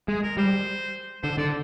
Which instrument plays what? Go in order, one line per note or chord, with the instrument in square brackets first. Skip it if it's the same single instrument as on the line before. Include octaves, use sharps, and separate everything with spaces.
[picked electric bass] G#3 [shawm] G#4
[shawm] A#4
[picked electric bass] G3 [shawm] C5
[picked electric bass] D3 [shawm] C5
[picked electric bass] D3 [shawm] D5